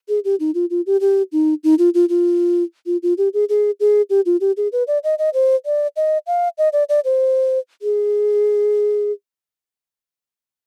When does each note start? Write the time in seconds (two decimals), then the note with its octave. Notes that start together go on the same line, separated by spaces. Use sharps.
0.09 G#4
0.25 G4
0.40 D#4
0.55 F4
0.70 F4
0.87 G4
1.01 G4
1.32 D#4
1.64 D#4
1.79 F4
1.94 F4
2.09 F4
2.86 F4
3.03 F4
3.18 G4
3.34 G#4
3.49 G#4
3.80 G#4
4.10 G4
4.26 F4
4.41 G4
4.57 G#4
4.72 B4
4.88 D5
5.04 D#5
5.19 D#5
5.34 C5
5.66 D5
5.96 D#5
6.27 F5
6.58 D#5
6.73 D5
6.89 D5
7.05 C5
7.82 G#4